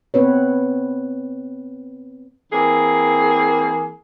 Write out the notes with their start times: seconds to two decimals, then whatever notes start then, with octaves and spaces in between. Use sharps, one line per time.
0.14 B3 C4 B4 C#5
2.53 E3 A#3 C4 G#4